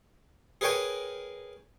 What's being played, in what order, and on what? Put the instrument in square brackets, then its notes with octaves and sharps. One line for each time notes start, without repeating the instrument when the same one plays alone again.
[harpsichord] G#4 A#4 B4 C#5 G5 G#5